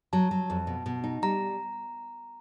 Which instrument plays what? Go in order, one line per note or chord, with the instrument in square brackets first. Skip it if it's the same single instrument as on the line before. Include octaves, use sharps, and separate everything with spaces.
[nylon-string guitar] F#3 [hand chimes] A5
[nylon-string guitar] F#3
F2
B2
B2
D#4
[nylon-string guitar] G3 [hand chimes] A#5